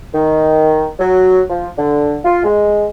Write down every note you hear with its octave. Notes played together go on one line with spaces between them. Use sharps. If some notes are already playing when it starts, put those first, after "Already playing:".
D#3
F#3
F3
D3
F4
G#3